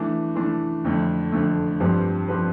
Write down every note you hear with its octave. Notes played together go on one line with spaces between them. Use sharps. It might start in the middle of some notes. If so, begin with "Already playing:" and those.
Already playing: E3 A3 D4
E3 A3 D4
F2 D3 A3
F2 D3 A3
G2 F3 C4 G4 B4
F3 C4 G4 B4